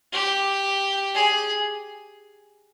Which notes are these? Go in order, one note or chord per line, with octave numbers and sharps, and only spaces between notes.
G4
G#4